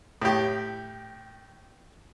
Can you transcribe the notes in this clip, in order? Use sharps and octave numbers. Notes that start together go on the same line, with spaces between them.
A2 G4